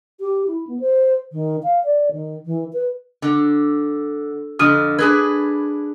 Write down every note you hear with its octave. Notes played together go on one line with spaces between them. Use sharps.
G4
E4
B3
C5
D#3
F5
D5
D#3
E3
B4
D3
F2 D3 D#6 F6 D#7
D4 G#4 B4 G#6